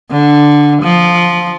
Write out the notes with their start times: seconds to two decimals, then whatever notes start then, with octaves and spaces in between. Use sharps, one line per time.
0.11 D3
0.83 F3